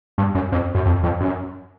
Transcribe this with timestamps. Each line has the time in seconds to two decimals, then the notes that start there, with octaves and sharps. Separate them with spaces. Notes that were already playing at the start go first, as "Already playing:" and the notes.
0.18 G2
0.35 F#2
0.52 F2
0.75 F#2
0.86 F2
1.03 F2
1.20 F#2